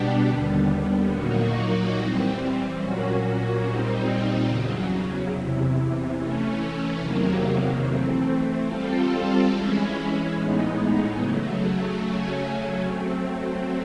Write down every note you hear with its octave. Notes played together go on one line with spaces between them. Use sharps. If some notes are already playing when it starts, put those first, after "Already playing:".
Already playing: B2 G3 B3 D4 G4
D#2 D3 G3 B3
A#2 F#3 A#3 D#4 F#4
E3 G3 C4
A#2 F#3 A#3 C#4 F#4
A#2 G3 C4 D#4
E2 C#3 F#3
E2 C3 E3
E3 A3 C#4
E2 C3 D#3 F#3 A#3
E3 A3 C4
G3 C4 F4 A4
E3 G#3 C#4 E4
A2 E3 G#3 B3 D#4
C#3 F#3 A3
C#3 F#3 A3 C#4
F#3 A3 C4